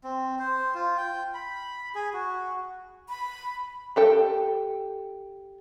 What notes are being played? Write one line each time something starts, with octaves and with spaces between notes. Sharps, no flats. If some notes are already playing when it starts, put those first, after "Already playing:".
C4
C5
F4
G5
B5
G#4
F#4
B5
G4 A4 G5